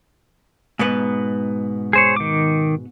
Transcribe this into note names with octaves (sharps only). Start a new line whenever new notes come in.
G#2 B2 B3
G#4 C5 C#5
D#3 D6